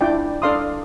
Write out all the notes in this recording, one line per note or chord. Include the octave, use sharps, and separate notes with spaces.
D4 E4 F4 D5 G5
D4 A4 D5 F5 C6 D#6